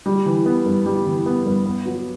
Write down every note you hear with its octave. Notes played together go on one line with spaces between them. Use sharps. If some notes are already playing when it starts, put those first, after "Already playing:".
G3
E3
B3
G2
G3
E3
B3
G2
B3
F#3